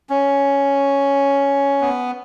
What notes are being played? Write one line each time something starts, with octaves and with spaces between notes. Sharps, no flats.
C#4
B3